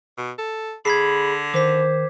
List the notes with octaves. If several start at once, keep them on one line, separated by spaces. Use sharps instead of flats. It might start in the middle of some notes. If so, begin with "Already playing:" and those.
B2
A4
D3 G#4 B5 G#6 B6 C7
D#3 C5 D6 B6